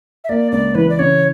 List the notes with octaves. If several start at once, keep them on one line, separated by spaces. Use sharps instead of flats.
E5
A#3 D5
C#2 D5
E3 B4
D5
C#3 C#5